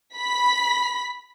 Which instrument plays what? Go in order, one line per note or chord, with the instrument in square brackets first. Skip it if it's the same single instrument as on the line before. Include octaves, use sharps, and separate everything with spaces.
[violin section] B5 B6